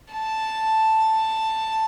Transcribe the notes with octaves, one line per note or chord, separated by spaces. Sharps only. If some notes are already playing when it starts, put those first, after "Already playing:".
A5